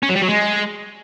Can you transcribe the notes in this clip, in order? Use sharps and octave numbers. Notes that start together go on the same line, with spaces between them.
C#4
F#3
G3
F#3
G#3